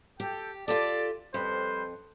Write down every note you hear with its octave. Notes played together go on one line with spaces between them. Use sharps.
G4 A4 G5
F4 G4 A4 D5
F2 G3 B4 C5